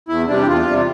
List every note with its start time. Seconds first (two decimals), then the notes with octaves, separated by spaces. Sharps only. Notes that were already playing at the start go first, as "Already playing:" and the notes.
0.09 E2 E4
0.28 C3 G3 D4
0.41 G4
0.47 E2 F4
0.67 C3 G3